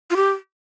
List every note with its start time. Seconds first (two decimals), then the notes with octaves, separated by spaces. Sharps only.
0.11 F4
0.16 G4